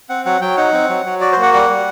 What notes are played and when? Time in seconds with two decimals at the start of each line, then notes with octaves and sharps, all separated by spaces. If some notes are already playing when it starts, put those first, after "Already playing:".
0.09 C4 F#5
0.26 F#3 F#5
0.41 F#3 G5
0.57 D#4 F#5
0.73 C4
0.89 F#3
1.06 F#3
1.21 F#4 D5
1.32 C5
1.37 A#3
1.42 F#5
1.53 G3 F#5
1.70 G3